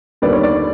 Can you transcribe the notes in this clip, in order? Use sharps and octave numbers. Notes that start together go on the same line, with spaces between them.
D#2 D3 G3 B3 D5
C#5
D5